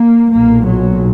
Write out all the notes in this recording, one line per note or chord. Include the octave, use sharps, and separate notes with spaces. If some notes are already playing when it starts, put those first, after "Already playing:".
Already playing: A#3
B1 A#2 A#3
F#3